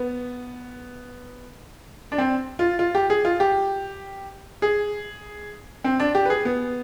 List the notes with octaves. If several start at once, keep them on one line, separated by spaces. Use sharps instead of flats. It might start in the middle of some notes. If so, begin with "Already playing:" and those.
Already playing: B3
D4
C4
F4
F4
G4
G#4
F4
G4
G#4
C4
D4
G4
B4
G#4
B3